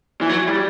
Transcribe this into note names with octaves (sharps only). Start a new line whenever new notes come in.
E3
F#3
G3